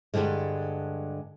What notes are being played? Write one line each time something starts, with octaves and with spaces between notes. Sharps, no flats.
G2 B2 D3 G3 G#3